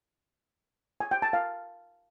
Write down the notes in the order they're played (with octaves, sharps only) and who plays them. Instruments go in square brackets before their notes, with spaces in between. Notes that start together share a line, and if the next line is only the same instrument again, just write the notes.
[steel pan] G#5
G5
A5
F5